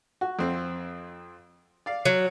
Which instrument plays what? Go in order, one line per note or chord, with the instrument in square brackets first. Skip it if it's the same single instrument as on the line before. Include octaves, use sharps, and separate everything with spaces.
[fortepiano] F#4
F2 C4
D5 F5
[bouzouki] F#3